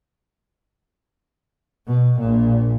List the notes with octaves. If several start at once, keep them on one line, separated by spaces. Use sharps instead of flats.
B2
A#1 A#2